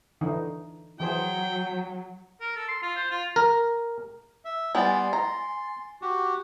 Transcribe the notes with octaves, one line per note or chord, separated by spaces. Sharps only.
D3 E3 D#4
E3 F#3 G#4 C5 G5
A#4
A4
C6
F4
C5
F4
A#4
E5
G3 B3 G#5 C6 A6
A#5
F#4 G4